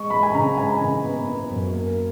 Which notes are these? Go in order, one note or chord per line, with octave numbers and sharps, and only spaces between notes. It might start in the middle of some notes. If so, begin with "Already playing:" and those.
Already playing: G#3 C#6
G#3 B5
G#5
C#3 A#5
G#3 G#5
A#5
C#3 G#5
B3
B3
F#2
A#3